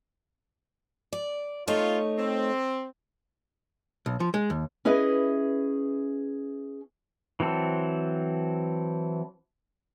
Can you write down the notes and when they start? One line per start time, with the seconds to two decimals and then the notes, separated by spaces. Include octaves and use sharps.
1.13 D5
1.68 A3 D#4 F4 C#5
2.18 C4
4.06 B1
4.20 F3
4.34 G#3
4.50 D#2
4.85 C#4 E4 G#4 B4 D#5
7.40 E3 F#3 C4 A4